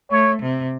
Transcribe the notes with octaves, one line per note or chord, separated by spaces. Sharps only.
A3 C#5
C3